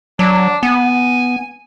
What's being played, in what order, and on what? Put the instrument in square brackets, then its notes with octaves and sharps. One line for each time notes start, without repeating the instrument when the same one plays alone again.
[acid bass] F#3 [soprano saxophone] D4
[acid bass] B3 [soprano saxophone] G#5